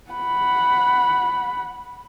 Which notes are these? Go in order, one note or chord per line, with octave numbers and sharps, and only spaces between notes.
F#5 B5